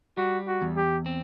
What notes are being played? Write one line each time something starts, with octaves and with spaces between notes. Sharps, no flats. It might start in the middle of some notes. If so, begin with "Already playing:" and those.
G3 F#4
F#4
E2
G4
C4